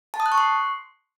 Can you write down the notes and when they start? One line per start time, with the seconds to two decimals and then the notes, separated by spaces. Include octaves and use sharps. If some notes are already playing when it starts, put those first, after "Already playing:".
0.14 A5
0.20 D#6
0.26 F#6
0.32 C#6
0.38 C6